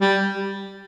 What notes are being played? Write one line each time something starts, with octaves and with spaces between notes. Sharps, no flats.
G3